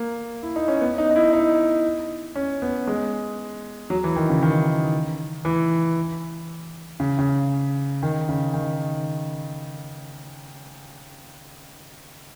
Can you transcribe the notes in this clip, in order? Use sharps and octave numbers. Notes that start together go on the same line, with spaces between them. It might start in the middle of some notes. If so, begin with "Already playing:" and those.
Already playing: A#3
E4
D#4
C#4
B3
D#4
D#4
E4
D#4
C#4
B3
G#3
F#3
E3
D#3
C#3
D#3
E3
C#3
C#3
D#3
C#3
D#3